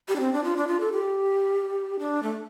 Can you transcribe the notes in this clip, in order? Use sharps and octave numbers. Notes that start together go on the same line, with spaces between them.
G4
D4
C4
D4
F4
D4
F4
A4
G4
D4
A3